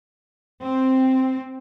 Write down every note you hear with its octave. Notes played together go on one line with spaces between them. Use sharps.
C4